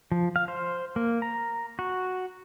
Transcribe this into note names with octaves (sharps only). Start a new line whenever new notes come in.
F3
F5
C5
A#3
A#5
F#4